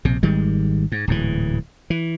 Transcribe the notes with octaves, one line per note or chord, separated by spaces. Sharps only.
A#1 C3
G#1 D#3 G3 G#3
G#2
D1 G#2 E3
E3